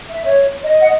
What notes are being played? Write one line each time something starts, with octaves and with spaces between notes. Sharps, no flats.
E5
C#5
D#5
F#5